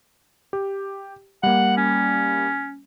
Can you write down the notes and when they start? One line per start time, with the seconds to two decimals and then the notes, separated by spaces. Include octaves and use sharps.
0.53 G4
1.43 G3 A#3 F#5
1.77 C#4